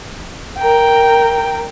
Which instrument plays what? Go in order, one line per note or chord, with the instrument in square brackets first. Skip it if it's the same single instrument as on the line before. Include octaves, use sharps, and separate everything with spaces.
[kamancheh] A#4 G5